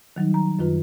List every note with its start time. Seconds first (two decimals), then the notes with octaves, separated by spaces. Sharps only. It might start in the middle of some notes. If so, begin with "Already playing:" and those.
0.16 D#3 F#3 G3 D#4
0.34 A#5
0.59 F#2 D#3 F4 B4